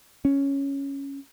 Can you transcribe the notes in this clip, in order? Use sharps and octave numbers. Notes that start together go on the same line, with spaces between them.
C#4